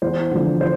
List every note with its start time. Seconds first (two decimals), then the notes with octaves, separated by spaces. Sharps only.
0.02 E2 C5
0.31 D3 F3
0.61 C5